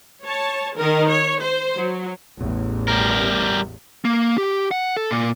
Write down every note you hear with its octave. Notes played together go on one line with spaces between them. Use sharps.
C#5 A5
D#3 A#4
C#5
C5
F#3
A1 E2 A2
G3 A#4
A#3
G4
F#5
A4
A#2